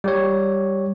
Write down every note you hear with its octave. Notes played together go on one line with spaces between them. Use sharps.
G3 G4 C#5